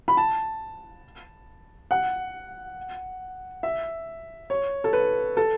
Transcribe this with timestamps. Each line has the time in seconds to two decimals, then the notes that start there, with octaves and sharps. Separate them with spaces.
0.08 B5
0.17 A5
1.91 F#5
3.63 E5
4.50 C#5
4.84 A4
4.93 B4
5.37 A4